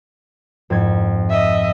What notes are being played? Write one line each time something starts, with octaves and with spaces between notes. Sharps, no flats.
F2 G#2 G#6
D#5 E5